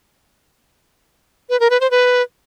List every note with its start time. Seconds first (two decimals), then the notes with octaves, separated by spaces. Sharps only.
1.50 B4
1.60 A#4
1.70 B4
1.81 C5
1.91 B4